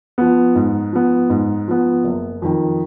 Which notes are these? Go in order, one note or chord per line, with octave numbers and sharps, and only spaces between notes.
F3 B3
G#2
F3 B3
G#2
F3 B3
F#1
F2 D#3